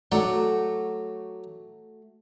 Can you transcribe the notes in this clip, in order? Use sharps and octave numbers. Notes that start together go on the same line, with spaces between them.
F#3 A3 F#4 D5